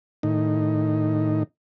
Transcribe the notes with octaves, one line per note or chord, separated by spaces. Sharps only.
A2 D#3 D#4